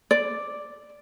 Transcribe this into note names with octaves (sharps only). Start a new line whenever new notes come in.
D5